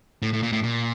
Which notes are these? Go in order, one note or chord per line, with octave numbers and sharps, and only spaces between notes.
A2
A2
A#2
A2
A#2